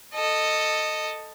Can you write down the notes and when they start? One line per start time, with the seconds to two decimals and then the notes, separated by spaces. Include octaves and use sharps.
0.15 A4 D#5